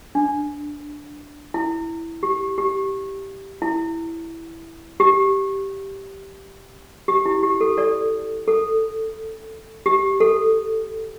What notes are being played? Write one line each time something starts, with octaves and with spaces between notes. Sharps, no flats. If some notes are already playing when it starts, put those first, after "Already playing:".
D4
E4
G4
G4
E4
G4
G4
E4
G4
A4
A4 D5
A4
G4
A4